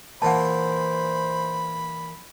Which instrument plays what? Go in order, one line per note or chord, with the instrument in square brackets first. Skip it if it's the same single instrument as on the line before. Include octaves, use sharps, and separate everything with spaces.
[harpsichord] A#2 E3 A#3 [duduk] C5 [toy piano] F#5 A5 [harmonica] B5